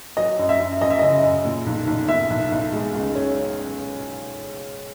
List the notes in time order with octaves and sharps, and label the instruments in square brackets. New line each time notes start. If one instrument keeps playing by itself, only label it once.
[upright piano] F#3 [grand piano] D#5
[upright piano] F#2
[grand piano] E5
[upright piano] F#2
[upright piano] F#2 [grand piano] D#5
[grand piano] E5
[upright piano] C#3 [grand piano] D#5
[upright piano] F#2
A#2
B1
B1
[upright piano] B1 [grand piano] E5
[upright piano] B1
B1
G#3
C#2
C#4